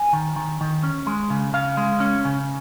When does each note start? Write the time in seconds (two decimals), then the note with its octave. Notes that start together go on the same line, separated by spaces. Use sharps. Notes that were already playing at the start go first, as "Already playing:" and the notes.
Already playing: G#5
0.13 D#3
0.36 D#3
0.61 D#3
0.83 C#4
1.07 G#3
1.30 C#3
1.53 C#3 F5
1.77 G#3
2.00 C#4
2.25 C#3